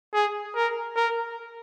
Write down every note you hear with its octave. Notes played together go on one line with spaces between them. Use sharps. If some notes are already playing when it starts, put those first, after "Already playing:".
G#4
A#4
A#4